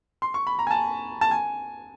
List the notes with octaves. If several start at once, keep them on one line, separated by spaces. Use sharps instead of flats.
C6
C#6
B5
A#5
G#5
A5
A5
G#5